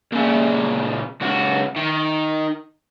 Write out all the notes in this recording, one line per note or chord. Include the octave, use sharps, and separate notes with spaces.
A#2 C#3
C#2 F#4
D#3